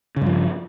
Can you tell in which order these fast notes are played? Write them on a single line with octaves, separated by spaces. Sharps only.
C#3 G2 F3